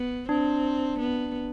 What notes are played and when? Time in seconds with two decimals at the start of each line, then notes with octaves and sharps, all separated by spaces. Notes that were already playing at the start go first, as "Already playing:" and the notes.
Already playing: B3
0.29 C4 D4
0.99 B3